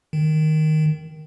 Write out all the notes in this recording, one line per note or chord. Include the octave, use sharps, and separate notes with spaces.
D#3